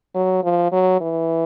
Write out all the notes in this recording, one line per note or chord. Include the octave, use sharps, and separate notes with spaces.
F#3
F3
F#3
E3